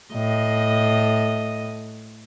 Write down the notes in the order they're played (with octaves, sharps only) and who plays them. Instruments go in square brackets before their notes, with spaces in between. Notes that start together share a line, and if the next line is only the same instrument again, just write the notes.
[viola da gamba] A2 D#5